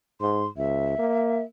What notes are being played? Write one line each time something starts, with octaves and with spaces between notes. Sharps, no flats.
G#2 C6
C#2 E5
A#3